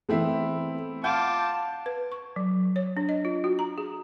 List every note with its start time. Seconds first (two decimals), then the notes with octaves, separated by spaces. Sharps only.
0.09 E3 A3 B3 C4 E4
1.04 F4 F#5 A5 D6 G6
1.86 B4
2.12 C#6
2.36 F#3
2.76 C#5
2.97 D4
3.09 D#5
3.25 F4
3.44 F#4
3.59 A#5
3.78 G#4